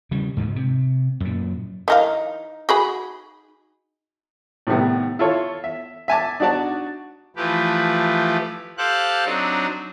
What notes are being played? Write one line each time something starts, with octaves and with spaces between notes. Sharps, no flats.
C#3 G3
D2 G#2
C3
F#2 A#2
E3 D#4 A#4 F5
F#4 G#4 B5
A2 C3 D#3 G3 B3
E4 F4 A4 C#5
E5
E5 G#5 A5 D6
D4 D#4 F#4 D5 A5
E3 F3 A3 G4 B4
G4 A4 C5 F5 F#6
F#3 C4 D4 D#4